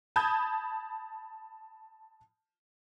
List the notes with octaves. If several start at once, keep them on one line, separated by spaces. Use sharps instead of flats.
A5 B5 D#6 G6 G#6